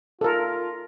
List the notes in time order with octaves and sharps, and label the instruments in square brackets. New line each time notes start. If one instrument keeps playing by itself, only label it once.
[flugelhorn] F4 [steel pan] A4 A#4